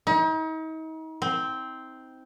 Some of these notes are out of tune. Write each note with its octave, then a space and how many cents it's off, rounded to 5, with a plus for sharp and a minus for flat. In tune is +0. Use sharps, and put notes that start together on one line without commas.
D#4 +40
C4 -5